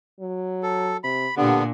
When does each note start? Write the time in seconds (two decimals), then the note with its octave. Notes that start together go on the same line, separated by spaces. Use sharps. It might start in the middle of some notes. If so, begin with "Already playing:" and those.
0.20 F#3
0.63 A4
1.04 C3 B5
1.37 A#2 D3 B3 D4 G4